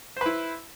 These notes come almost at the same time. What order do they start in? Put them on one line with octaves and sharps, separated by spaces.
C5 B4 E4